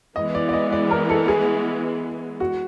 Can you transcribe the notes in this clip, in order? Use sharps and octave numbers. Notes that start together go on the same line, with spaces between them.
E3 G#3 B3 D#5
D5
D5
D#5
D5
A#4
A4
G#4
F#4